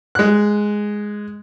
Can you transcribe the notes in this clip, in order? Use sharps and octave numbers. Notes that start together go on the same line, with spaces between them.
G#3 F#6